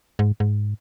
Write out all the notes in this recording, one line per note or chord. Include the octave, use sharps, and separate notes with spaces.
G#2
G#2